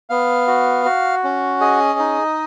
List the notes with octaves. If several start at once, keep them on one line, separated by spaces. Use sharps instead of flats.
B3 F5
F#4
F#4
C#4
G#4 D#5
D#4